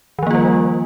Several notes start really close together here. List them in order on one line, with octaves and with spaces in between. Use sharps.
D#3 F3 A#3 F4 G3